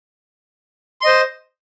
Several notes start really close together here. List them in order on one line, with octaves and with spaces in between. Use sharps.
C6 D#5 C5